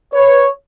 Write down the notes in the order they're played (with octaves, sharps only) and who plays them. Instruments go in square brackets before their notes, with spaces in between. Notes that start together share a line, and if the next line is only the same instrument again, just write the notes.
[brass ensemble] B4 C#5